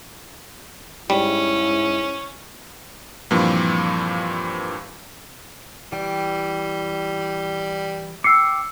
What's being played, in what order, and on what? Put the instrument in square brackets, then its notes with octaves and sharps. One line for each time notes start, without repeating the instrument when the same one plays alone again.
[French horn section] G#2 E4 [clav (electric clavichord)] G3 [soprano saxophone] C#4
[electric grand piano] G2 A#2 E3 F3 A#3 C4
[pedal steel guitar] E3 G5 [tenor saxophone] G3
[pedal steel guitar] G5 D6 [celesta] E6 C7 C#7